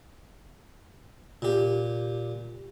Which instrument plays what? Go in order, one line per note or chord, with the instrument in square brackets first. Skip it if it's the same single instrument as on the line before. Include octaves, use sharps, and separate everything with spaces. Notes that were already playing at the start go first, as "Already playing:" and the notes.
[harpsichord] A#2 G4